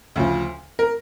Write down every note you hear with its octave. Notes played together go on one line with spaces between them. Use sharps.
D2 C#3 F3
A#4